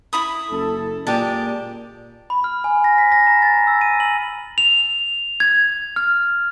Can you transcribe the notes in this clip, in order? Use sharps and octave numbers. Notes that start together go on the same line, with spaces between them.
E4 B5 D#6
F#1 A4
A#2 G#3 G4 D5 A5
B5
F6
G#5
A#6
B6
A#6
A#5
A6
E6
D#7
F#7
F7
G#6
F6